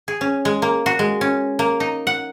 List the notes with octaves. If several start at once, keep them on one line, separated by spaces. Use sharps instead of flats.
G#4
C#4
G#3
A#3
F#4
G#3
C#4
A#3
D#4
F#5